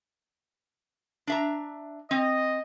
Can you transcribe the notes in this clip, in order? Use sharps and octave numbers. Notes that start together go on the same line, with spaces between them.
D4 E5 A#5
C4 D#5